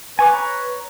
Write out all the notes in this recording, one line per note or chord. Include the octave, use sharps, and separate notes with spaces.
B4 G#5 C#6 D6
C#5 A#5 C#6